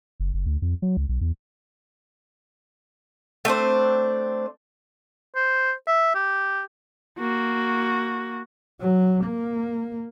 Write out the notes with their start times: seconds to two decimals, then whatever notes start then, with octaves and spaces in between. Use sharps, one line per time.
0.20 F#1
0.34 F#1
0.46 D2
0.62 F2
0.82 F#3
0.97 C#2
1.09 B1
1.21 E2
3.45 A3 C4 D4 C5
5.36 C5
5.87 E5
6.15 G4
7.19 A#3 F#4
8.81 F#3
9.24 A#3